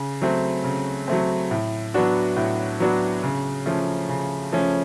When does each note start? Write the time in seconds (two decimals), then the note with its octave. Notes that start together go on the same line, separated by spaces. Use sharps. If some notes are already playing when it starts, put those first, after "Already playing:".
Already playing: C#3
0.22 F#3 A3 C4
0.64 C#3
1.08 F#3 A3 C4
1.51 A2
1.94 F#3 B3 D4 F#4
2.37 A2
2.80 F#3 B3 D4 F#4
3.23 C#3
3.66 F3 A3 C#4
4.09 C#3
4.52 F3 A3 C#4